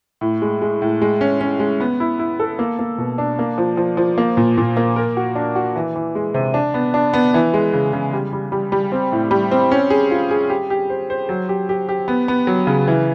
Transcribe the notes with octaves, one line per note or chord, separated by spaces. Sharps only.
A2
G#3
G#3
A2
G#3
C#4
C#4
G#3
B3
E4
E4
A4
A#3
A#3
B2
D4
A#3
F3
F3
F3
A#3
A#2
A#2
A#3
A#4
F#4
D4
F#4
E3
E3
G#3
C3
D4
B3
D4
B3
E3
G#3
C#3
C#3
G3
G3
G3
G3
C4
A2
G3
C4
C#4
G#4
F4
G#4
G4
G4
C5
C5
F#3
G4
G4
G4
B3
B3
F#3
C#3
E3